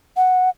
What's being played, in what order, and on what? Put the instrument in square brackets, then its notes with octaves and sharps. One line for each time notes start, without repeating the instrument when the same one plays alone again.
[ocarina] F#5